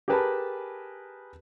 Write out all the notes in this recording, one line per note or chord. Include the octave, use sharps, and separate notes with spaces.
G4 G#4 A#4 B4 A5 B5